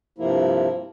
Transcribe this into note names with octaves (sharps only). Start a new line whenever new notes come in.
G2 C3 F3 A#3 E4